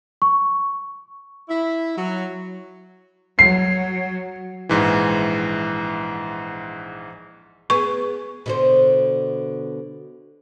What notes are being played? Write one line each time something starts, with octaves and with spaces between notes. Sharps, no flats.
C#6
E4
F#3
F#3 C7
A#1 G#2 E3
B3 G#4 C#6
B2 D3 C5